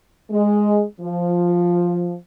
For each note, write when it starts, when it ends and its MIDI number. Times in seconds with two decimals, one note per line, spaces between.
0.30 0.82 56
0.99 2.14 53